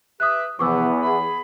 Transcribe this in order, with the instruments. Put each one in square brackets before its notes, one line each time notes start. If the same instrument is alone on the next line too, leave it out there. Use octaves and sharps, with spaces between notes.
[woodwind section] G4 B4 E5 [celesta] D#6 F#6
[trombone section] E2 B3 [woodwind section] C3 E3 F3 [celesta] C#6 D6 E6
[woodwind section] G#4 B5